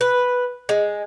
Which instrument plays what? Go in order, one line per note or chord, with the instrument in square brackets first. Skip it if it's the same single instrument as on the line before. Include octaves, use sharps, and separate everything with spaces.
[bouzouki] B4
G#3